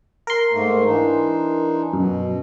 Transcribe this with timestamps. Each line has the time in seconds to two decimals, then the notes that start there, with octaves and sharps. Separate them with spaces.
0.27 A#4 C6
0.53 G#2 A3 A#3
0.86 E3 D4 D#4
1.93 F#2 B2